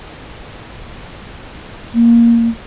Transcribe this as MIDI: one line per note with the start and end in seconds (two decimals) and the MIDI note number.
1.94 2.48 58